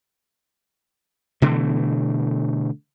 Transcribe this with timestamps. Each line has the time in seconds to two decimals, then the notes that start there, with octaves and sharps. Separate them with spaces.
1.42 B2 D3 E3 A3